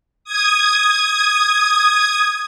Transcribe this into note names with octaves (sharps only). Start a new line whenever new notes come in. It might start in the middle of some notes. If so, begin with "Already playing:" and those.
D#6 G#6